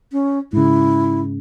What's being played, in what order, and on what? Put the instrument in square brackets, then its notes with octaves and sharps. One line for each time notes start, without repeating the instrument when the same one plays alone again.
[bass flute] C#4
[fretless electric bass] G#2 C#3 [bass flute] E4